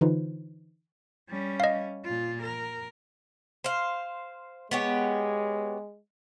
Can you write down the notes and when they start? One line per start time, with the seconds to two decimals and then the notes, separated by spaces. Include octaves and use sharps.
0.01 D3 E3 D#4 F4 B4 C5
1.29 G3 C#4
1.60 D#5 F5
2.04 A#2 F4
2.43 A#4
3.64 C5 F5
4.71 G#3 B3 G4 C#5